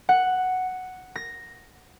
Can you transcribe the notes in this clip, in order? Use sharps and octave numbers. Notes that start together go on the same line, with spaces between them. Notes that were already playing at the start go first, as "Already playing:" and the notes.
F#5
A#6